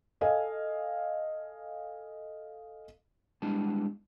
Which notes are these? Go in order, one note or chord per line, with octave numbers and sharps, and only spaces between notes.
A4 D#5 F5 G#5
G3 G#3 B3 D4 E4 A5